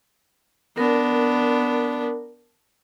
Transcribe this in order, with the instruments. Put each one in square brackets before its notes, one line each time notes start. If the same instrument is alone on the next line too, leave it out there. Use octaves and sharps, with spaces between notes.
[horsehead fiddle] B3 D4 [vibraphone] A#4